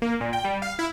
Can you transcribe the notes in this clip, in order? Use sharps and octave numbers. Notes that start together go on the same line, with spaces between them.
A#3
A#2
G5
G3
F5
E4